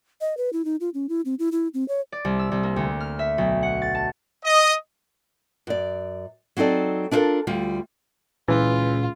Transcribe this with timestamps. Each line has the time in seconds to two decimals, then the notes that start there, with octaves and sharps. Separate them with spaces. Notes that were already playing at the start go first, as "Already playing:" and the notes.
0.21 D#5
0.37 B4
0.53 E4
0.65 D#4
0.81 F4
0.94 C#4
1.09 E4
1.25 C4
1.39 E4
1.52 E4
1.74 C4
1.88 C#5
2.12 D5
2.25 C2
2.39 E6
2.52 C2
2.63 A#3
2.76 D2
3.00 F6
3.19 E5
3.38 B1
3.63 F#5
3.82 A6
3.95 A5
4.44 D#5
5.67 F#2 D5
6.57 F#3 C4 D#4 A4 D5
7.11 D4 E4 F4 G4 A4 A#4
7.47 D2 G3 F4
8.48 C#2 A#2 E3 F4